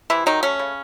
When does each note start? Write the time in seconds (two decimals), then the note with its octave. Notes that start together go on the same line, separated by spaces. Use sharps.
0.10 C3 E3 E4
0.26 D#3 F#3 D#4
0.43 A3 C#4
0.59 C#3